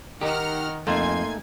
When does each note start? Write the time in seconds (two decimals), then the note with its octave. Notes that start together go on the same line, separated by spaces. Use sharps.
0.21 D#3 D#4 G4 F#5 A#5 F6
0.87 F2 A3 A#3 D#4 G#5 C6 G#6